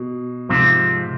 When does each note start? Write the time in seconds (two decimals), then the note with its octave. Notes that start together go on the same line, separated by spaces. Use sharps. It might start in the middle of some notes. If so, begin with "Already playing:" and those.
Already playing: B2
0.49 G#2 C3 F3 C4